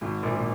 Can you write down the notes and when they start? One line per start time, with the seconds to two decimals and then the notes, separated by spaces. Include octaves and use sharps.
0.01 G#1 G#2
0.23 A#1 A#2
0.36 A#2